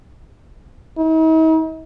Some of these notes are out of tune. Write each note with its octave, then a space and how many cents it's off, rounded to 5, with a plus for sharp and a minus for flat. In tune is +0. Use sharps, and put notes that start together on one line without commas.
D#4 +45